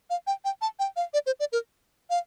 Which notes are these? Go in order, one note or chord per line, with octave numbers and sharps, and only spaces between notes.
F5
G5
G5
A5
G5
F5
D5
C5
D5
A#4
F5